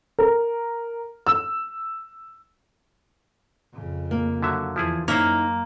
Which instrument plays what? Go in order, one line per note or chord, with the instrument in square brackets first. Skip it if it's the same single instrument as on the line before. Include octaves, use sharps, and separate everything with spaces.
[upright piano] A#4
E6
[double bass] F2 C#3
[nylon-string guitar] A#3
[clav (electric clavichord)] D3 F#3 E5
[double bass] E2 [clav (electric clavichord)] F3 E4 G#4
[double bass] F#2 [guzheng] A#3 [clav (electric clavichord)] C#4 E4 C5 [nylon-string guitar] D#4